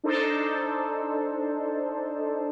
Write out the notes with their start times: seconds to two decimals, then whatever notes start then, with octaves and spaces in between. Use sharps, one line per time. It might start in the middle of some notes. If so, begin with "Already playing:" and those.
0.04 D4 D#4 A4 C5